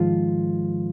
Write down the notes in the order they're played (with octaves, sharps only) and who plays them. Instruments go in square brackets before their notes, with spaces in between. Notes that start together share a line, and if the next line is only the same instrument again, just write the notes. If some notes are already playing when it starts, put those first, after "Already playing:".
Already playing: [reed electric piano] G#2 D#3 F3 G#3 F4